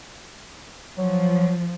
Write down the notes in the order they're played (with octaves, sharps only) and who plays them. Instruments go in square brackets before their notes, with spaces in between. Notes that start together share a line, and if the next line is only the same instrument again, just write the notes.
[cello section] F3 [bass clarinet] F#3